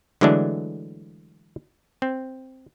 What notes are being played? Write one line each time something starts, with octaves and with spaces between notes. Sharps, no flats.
D3 E3 F#3 G#3 A3 D4
C4